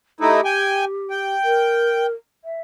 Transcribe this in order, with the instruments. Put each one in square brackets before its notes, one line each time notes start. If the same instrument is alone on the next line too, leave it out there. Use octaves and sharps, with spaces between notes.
[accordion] A3 D#4 E4 [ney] G4
[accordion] G5 G#5
G5
[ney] A#4
E5